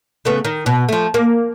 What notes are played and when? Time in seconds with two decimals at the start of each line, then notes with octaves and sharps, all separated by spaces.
0.25 C#3 A3 B3
0.45 D#3
0.66 B2
0.89 F3 A3
1.14 A#3